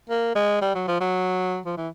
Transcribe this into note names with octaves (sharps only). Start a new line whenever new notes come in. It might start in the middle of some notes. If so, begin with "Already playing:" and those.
A#3
G#3
G3
F#3
F3
F#3
F3
E3